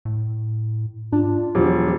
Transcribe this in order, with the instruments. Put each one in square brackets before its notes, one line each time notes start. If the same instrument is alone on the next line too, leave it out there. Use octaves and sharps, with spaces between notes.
[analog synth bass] A2
[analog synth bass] G#2 [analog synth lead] D4 [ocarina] F4
[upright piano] E1 F3 [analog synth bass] F#3 [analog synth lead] G4